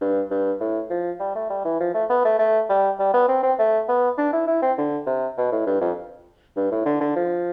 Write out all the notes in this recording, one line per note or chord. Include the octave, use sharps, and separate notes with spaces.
G2
G2
A2
F3
G3
A3
G3
E3
F3
A3
B3
A3
A3
G3
G3
B3
C4
C4
A3
B3
D4
E4
E4
C4
D3
C3
B2
A2
G2
F2
G2
A2
D3
D3
F3